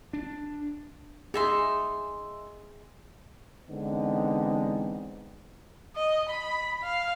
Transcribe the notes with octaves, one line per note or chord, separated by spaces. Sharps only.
D4
D#4 G#4 E5 C6
D3 E3 G#3 B3 C4 D#4
D#5
B5
F5